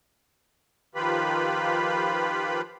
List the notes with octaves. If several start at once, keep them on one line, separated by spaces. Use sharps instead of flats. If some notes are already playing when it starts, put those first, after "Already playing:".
D#3 F3 F4 G4 B4 B5